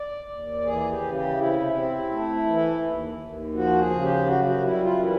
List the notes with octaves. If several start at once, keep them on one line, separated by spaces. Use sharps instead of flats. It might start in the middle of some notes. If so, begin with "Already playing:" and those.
Already playing: D5
D#2
E3 G#4
G4
C#3
G4
C3 E4
C4
A3
E3
D#2
D#2
F3 F#4
G#4
C#3
G4
F#2 F#4
F#4
G3 E4
F4
E3 E4